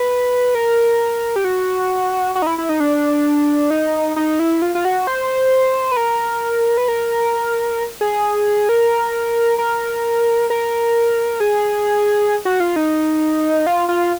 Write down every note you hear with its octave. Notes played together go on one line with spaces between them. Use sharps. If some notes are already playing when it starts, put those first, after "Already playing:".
Already playing: B4
A#4
G4
F#4
F#4
D#4
E4
E4
D#4
D4
D#4
D#4
E4
F4
F4
F#4
C5
B4
A#4
B4
A#4
G#4
A#4
A#4
A#4
G#4
F#4
F4
D#4
F4
F4